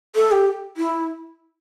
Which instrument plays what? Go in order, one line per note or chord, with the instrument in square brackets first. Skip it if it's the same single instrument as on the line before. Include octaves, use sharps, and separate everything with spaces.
[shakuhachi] A4
G4
E4